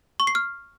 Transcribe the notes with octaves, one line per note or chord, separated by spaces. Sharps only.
C#6
C7
F6